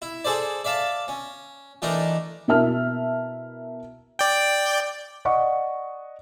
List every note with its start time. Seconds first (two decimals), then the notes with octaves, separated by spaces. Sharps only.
0.02 E4
0.25 G#4 A4 C5 D5
0.64 D5 E5 F5 A5
1.08 C#4
1.82 E3 A3 D4 D#4 A#4
2.48 B2 E4 A#4 E5 A5 F6
4.19 D5 G5
5.25 D5 D#5 F#5 C#6